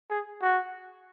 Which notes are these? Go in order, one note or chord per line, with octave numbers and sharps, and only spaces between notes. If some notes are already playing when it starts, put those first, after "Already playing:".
G#4
F#4